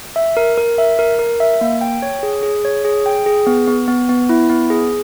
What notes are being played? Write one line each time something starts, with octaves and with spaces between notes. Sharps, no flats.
E5
A#4
A#4
E5
A#4
A#4
E5
A#3
G5
C#5
G#4
G#4
C#5
G#4
G5
G#4
B3
B3
B3
B3
E4
B3
G#4